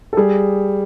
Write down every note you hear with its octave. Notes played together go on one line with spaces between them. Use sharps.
A4
G3 G#4